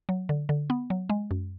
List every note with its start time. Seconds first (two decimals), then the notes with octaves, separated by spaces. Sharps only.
0.09 F#3
0.29 D3
0.49 D3
0.70 B3
0.90 F#3
1.10 G#3
1.31 F#2